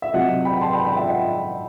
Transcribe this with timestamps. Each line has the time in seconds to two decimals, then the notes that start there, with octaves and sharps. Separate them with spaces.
0.02 E5
0.13 C3 F#3 D#5 F#5
0.45 G5 B5
0.61 A5 C6
0.73 G5 B5
0.85 G5 B5
0.97 E5 G5
1.08 D#5 F#5